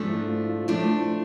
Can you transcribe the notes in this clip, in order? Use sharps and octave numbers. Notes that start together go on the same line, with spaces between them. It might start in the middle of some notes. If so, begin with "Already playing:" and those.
Already playing: G#2 F3 A3 D4
E4
F4
F4
F3 A3 D4 E4